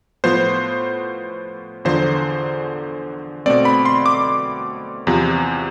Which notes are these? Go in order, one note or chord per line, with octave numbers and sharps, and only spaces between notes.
A2 F3 B3 C5
E2 D3 F3 C5
B2 A3 C4 D5
B5
C6
D6
E2 C3 F3